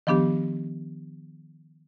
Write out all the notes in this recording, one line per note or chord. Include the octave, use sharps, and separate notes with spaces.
D#3 F3 B3 D4 G4